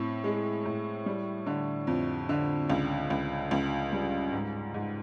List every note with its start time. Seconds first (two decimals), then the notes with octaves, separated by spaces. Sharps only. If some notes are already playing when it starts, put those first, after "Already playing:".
Already playing: A2 C4
0.24 G#3
0.65 A2
1.06 G3
1.46 D3
1.87 F2
2.29 D3
2.70 C#2
3.10 C#2
3.51 C#2
3.93 G3
4.32 G#2
4.74 G#2